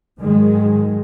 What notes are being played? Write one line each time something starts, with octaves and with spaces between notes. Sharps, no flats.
G#2 D#3 F#3 G#3